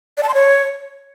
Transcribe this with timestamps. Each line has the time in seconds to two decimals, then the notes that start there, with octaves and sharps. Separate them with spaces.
0.18 D5
0.23 A5
0.29 C6
0.34 C#5